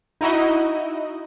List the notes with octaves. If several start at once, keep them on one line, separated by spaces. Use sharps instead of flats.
D#4 E4 F#4 D#5